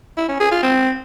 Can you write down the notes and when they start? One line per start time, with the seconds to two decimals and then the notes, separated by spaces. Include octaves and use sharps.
0.17 E4
0.29 C#4
0.40 G#4
0.51 F4
0.63 C4